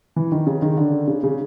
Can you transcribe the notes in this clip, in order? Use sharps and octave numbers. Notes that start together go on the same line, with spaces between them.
E3
D#3
C#3
D#3
D3
C#3
C#3